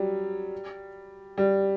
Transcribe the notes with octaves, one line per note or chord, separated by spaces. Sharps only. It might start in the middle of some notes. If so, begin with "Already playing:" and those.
Already playing: F#3 G3
G3